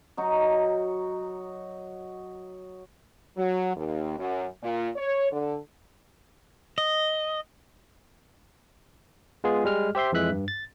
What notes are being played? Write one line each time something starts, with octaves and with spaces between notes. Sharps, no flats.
F#3 D#4 F#4
F#3
D#2
F#2
A#2
C#5
D3
D#5
G#3 B3 F4 G#4
G3 G#3 F6
G4 C5 E5 C6
F2 E3 G#3 E5 F#6 B6
G2
A6